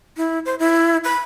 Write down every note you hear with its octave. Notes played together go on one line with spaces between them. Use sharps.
E4
C5
E4
B5